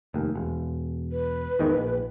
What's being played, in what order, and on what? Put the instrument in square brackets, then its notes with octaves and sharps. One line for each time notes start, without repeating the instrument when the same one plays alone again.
[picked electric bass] F1 D#2
E1
[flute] B4
[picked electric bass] E2 G#2 D#3
A#1